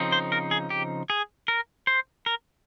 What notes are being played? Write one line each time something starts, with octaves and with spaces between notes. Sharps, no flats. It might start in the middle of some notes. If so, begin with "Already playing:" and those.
Already playing: C#3 F3 C4 D#4
C5
A#4
G#4
G4
G#4
A#4
C5
A#4